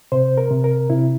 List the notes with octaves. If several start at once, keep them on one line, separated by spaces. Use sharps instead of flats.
C3 C5
A#4
C3
A#4
C3 E4